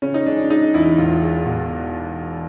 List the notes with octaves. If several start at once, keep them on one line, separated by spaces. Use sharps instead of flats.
C#3 C#4
D#4
G#3 D4
D4
G#3 D#4
E2 E4
E1 F4
G#3
B2 F#4